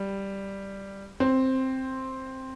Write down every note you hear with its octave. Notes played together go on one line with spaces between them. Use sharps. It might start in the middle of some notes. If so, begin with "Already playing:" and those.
Already playing: G3
C4